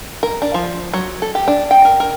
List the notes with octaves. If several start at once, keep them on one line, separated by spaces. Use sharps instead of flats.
A#4
D4
F3
F#3
A4
G4
D4
G5
A#4
A#4